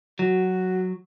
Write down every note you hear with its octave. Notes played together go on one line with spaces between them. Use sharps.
F#3 F#4